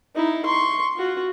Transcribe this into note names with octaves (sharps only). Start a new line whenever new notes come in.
D#4 E4
C6 C#6
F4 F#4